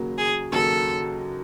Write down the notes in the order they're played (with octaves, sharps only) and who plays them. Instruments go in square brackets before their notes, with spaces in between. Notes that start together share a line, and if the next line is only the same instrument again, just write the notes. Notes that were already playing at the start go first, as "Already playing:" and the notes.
Already playing: [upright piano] D#2 C#3 F#3 A#3
[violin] G#4
[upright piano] D#2 C#3 F#3 A#3 [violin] A4